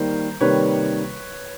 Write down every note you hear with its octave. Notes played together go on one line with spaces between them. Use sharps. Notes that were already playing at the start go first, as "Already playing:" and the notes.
Already playing: D#3 G3 A#3 A#4 C5
C3 D#3 G3 A#3 B4 C#5